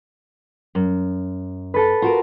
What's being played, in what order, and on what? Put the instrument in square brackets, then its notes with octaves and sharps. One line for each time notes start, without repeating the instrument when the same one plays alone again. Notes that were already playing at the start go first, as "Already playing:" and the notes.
[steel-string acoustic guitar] F#2
[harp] A4 B4
[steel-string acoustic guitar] F4 F#4 A#4